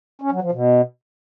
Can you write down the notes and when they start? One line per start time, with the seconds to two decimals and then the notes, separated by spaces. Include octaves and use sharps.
0.21 C#4
0.32 F#3
0.42 F3
0.52 B2